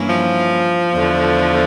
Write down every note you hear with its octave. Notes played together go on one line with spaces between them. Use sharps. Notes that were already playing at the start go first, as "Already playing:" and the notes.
Already playing: G2 E3 A#3 C#4 E4
F3
E2 D3 A3